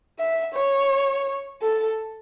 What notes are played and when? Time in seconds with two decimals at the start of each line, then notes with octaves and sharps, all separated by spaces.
0.19 E5
0.54 C#5
1.62 A4